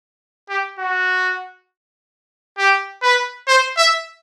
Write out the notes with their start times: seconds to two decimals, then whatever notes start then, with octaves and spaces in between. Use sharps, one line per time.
0.49 G4
0.79 F#4
2.58 G4
3.02 B4
3.48 C5
3.77 E5